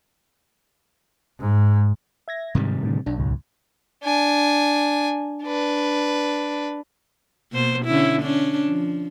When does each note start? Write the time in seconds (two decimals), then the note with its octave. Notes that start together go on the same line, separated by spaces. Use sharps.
1.40 G#2
2.28 E5 G#6 A#6
2.55 G#2 C3 D#3 G3
2.83 A2 D3
3.06 B1 D4
3.18 C#2 G#2
4.03 D4 G#5
5.43 D4 B4
7.52 B2 A#3 C5
7.85 D3 C#4 E4
8.22 C#4 D4
8.64 F3